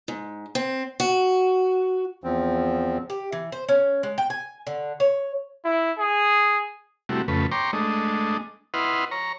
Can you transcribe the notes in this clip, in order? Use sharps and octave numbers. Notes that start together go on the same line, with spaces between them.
G#2
C4
F#4
E2 F3 C4
G4
E3
C5
C#4
G#3
G5
G#5
D3
C#5
E4
G#4
C3 G3 A3 E4 F#4
F2 C#3 A3 B4
C#5 G5 A#5 C6 D6
G#3 A3 D4 D#5
E4 B4 D#5 F#5 C6 F6
C#5 A#5